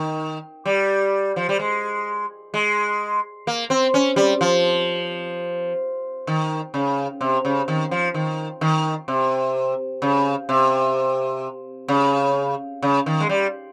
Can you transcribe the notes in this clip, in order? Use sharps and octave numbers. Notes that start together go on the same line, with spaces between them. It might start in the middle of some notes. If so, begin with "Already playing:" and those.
Already playing: D#3
G3
F3
G3
G#3
G#3
A#3
C4
C#4
G3
F3
D#3
C#3
C3
C#3
D#3
F3
D#3
D#3
C3
C#3
C3
C#3
C#3
D#3
G#3
G3